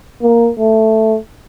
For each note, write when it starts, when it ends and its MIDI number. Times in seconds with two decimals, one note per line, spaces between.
0.22 0.50 58
0.59 1.17 57